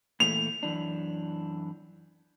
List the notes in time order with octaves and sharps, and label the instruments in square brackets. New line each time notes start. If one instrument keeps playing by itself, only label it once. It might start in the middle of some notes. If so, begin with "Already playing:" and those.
[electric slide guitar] A#2 E3 A3 [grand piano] F7
[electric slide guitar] F#2 E3 D4